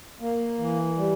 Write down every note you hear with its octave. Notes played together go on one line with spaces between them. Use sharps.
A#3
E3
G3